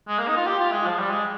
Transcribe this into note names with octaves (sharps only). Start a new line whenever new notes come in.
G#3
A#3
D#4
F4
G4
F4
G#3
F3
G3
G#3